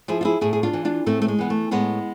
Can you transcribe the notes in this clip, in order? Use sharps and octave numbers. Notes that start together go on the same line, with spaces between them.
F3 E4 G#4
F4
E4 G#4
A2 E4 G#4
G#4
D4 F4
E3
D4 F4
A2 A3 C4
A3
G#3
E3 B3
A3
A2 G#3 B3